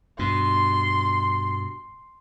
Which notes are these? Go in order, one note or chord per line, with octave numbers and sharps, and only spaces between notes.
G2 B2 C6